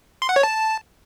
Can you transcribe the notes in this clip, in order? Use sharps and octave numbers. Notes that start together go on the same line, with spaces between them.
C6
F#5
C#5
A5